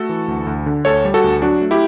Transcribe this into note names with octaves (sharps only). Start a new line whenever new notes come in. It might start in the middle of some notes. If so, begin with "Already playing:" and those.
Already playing: A3 F#4 A4
E3
D2
D2
D3
D2 A4 C#5
G3
F#4 A4
D2
F#3 D4 F#4
A3
E4 G4